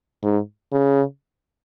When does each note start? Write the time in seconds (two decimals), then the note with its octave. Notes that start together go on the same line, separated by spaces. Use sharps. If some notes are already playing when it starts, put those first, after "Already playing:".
0.23 G#2
0.72 C#3